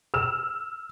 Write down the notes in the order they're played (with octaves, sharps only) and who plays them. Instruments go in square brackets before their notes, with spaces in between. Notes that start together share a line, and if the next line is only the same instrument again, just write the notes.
[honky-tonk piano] E6 F6 E7